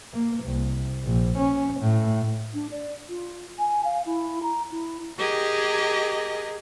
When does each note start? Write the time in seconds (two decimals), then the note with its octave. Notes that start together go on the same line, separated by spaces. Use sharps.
0.14 A#3
0.44 C2
1.05 A#1
1.38 C#4
1.81 A2
2.54 D4
2.71 D5
3.09 F4
3.59 G#5
3.85 F5
4.06 E4
4.43 A#5
4.71 E4
5.18 G4 G#4 A#4 D#5